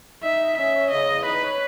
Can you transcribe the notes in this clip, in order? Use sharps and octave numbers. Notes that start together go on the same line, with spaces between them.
D#4 E5
D#5
C#4 E5
C#5
C#3 D#5
E2
D#4 B4
C#5